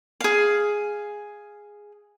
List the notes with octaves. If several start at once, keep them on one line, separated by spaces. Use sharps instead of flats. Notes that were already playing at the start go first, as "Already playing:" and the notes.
G#4 F5